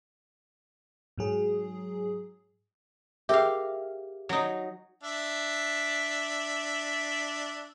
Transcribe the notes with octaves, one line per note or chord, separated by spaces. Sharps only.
G#2 F#3 G#4
G4 G#4 A#4 E5 F5
F#3 D#4
D4 E5